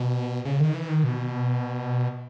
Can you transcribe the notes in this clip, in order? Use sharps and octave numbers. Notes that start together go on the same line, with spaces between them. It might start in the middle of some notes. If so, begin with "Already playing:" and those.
Already playing: B2
C#3
D#3
E3
D#3
B2